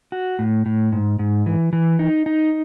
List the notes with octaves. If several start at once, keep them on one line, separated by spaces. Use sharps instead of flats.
F#4
A2
A2
G#2
G#2
E3
E3
D#4
D#4